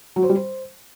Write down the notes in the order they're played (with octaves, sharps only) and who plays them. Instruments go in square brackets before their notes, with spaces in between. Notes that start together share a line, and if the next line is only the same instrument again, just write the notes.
[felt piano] F#3
C5
G3
C5